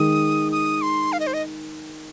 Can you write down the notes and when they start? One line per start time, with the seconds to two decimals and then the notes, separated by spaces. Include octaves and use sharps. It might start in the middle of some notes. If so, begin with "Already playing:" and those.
Already playing: D#3 G#3 D#6
0.52 D#6
0.82 C6
1.13 F5
1.20 D#5
1.27 C5
1.34 D#5